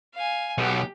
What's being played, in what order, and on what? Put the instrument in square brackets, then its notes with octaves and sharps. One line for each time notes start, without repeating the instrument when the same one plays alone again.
[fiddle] F5 G#5
[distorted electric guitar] B1 B2 [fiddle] G4